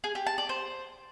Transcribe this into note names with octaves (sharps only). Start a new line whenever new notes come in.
G#4
G4
A5
D5
C5